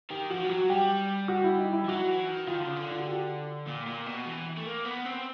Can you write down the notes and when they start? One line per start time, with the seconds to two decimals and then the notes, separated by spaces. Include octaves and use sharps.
0.10 D#3 G4
0.30 F3 F#4
0.44 G3
0.50 F#3 F#4
0.69 G3 G4
1.28 F#4
1.44 E4
1.58 D#4
1.73 E4
1.84 F3
1.88 F#3 F#4
2.08 E3
2.28 D#3
2.47 D#3 F4
2.57 D3
2.67 C#3
2.76 D3
2.91 F4
2.99 F#4
3.07 G4
3.67 A#2
3.86 A#2
4.06 B2
4.26 E3
4.57 A3
4.66 A#3
4.85 B3
5.05 C4